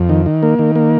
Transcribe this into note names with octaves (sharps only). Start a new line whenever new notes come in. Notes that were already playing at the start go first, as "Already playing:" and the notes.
Already playing: F2
D#3
D#3
A#3
D#3
A#3